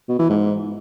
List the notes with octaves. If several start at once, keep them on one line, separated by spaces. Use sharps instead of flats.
B2
E3
G#2